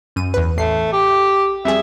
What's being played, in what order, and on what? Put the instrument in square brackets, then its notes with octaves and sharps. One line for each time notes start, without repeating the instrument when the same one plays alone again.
[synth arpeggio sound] F#2 D#7
E2 B4
[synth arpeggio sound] A1 C7 [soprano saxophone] A3
[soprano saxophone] G4
[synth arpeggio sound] F2 G3 G#4 [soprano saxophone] E5